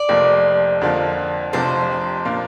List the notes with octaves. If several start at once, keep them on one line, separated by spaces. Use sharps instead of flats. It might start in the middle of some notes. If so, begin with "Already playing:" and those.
Already playing: D5
F1 F2 F3 A#3
F2 D3 F3 A#3
F1 F2 C3 F3 D4 C5
A#2 A#3 D4